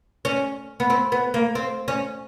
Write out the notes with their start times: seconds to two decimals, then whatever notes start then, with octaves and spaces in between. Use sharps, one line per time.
0.25 C#4
0.80 B3
0.90 C4
1.12 B3
1.34 A#3
1.55 C4
1.88 C#4